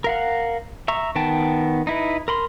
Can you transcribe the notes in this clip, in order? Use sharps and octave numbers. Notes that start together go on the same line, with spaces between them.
A#4 F5 F#5
E5 A#5 C#6
D#3 B3 G5 A5
D#4 E4 B4
A#4 B5 C6